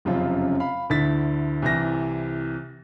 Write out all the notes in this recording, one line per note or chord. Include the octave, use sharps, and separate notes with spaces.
F1 F#2 C#3 F3 F4
F5 B5
D2 D3 E4 A6 B6
C2 C3 E3 A#6